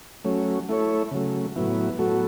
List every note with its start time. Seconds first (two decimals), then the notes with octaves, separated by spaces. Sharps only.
0.24 F#3 A3 C#4
0.69 A3 E4 A4 C#5
1.11 C#3 F#3 A3
1.56 A2 F#3 B3 E4
1.99 A2 F#3 B3 F#4 A4